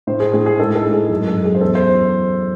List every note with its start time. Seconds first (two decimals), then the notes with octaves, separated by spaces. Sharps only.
0.07 A2 C5
0.20 G#4
0.33 A2 G#4
0.46 G#4
0.58 G#2 A4
0.76 A4
0.85 G#2
0.93 G#4
1.10 F#2
1.27 A4
1.36 F#2
1.45 G#4
1.55 C5
1.61 E2 A4
1.75 C5